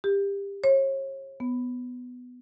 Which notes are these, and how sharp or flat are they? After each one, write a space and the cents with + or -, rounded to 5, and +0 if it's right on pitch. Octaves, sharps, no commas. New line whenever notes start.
G4 +25
C#5 -40
B3 +10